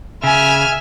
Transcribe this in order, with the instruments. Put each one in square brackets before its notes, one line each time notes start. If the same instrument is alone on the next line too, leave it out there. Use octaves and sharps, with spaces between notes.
[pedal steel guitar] C#3 [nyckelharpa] E5 [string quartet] G#5 F6